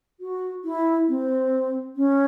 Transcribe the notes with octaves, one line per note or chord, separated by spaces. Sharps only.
F#4
E4
C4
C#4